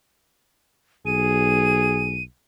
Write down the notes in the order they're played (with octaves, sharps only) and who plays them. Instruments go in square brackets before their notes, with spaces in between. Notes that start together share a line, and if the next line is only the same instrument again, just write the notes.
[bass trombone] B1 [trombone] G#4 [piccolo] D#7